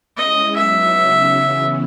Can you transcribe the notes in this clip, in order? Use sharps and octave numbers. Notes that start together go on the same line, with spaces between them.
G#3 C#4 E4 D#5
F#3 B3 D#4 E5
C#3 F#3 C#4
C#3 E3 B3